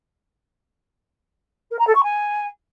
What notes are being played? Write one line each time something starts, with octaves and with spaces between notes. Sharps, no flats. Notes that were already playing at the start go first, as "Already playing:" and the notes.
A#4
A#5
A4
C#6
G#5